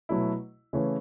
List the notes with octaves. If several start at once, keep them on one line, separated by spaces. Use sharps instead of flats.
B2 F#3 A3 E4
C#3 E3 A3 C#4 E4